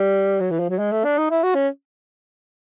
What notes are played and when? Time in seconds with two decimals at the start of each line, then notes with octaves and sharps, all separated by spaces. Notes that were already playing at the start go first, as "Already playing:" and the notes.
Already playing: G3
0.40 F#3
0.51 E3
0.59 F3
0.69 F#3
0.79 G#3
0.92 A3
1.04 D4
1.18 D#4
1.30 E4
1.43 F#4
1.55 C#4